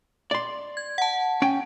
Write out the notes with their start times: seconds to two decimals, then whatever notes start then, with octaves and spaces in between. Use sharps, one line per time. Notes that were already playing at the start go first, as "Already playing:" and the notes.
0.31 D5 C6
0.77 G#6
0.98 F#5 A5
1.42 C#4 G5